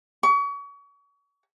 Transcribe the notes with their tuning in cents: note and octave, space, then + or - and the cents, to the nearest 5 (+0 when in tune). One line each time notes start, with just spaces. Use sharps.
C#6 +35